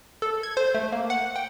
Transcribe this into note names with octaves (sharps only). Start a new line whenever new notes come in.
A4
G#6
C5
A3
A#3
F#5
G5